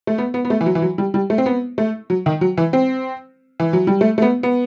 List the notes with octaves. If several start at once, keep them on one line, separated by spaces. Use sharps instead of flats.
A3
B3
B3
B3
A3
E3
F#3
E3
F#3
G3
G3
A3
C4
B3
A3
F#3
D#3
F#3
E3
C4
E3
F#3
G3
A3
A3
B3
B3